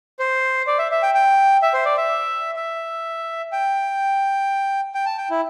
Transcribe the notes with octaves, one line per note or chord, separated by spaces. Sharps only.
C5
D5
E5
E5
G5
G5
E5
C5
D5
E5
E5
G5
G5
A5
G5
E4